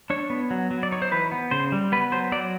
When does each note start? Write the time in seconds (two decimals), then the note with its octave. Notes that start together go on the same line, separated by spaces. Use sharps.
0.10 D4 C#5
0.30 B3
0.51 F#3
0.71 F#3
0.83 D5
0.91 D#4 C#5
1.02 C5
1.11 E3 B4
1.31 B3
1.51 C#3 C5
1.72 G3
1.92 B3 B4
2.12 F#3 C5
2.32 F#3 D5